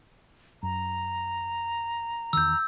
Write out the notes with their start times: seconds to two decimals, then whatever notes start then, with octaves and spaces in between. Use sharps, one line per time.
0.63 F#2 A#5
2.33 E2 D#3 E6 G6